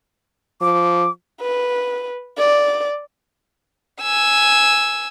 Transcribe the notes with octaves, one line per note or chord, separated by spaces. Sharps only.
F3 D6
B4
D5
G#5 E6